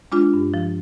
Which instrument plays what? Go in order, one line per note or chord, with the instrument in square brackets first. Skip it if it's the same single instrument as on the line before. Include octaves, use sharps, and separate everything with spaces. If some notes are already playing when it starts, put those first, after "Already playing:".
[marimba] G#3 D4 F4
G2
F3